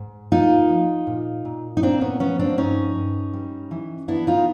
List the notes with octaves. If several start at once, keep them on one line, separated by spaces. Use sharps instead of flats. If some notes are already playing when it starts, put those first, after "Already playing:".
Already playing: G#2
A#3 D#4 F4
F3
A#2
A#2
D#4
A#3 C4 D4
B3 C#4
F3 B3 C#4
C4 D4
G2 C#4 D#4
G2
G3
E3
B3 D4 E4
D#4 F4